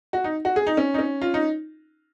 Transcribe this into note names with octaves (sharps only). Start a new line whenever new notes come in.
F#4
D#4
F#4
G#4
D#4
C#4
D#4
C#4
F4
D#4